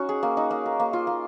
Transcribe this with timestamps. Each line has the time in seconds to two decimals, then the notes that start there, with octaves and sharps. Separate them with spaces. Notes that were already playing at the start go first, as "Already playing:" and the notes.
Already playing: C#4 D#4 F#4
0.09 G#4
0.23 A#3
0.37 D#4
0.51 A#3
0.66 A#4
0.80 A#3
0.93 F4
1.07 A#3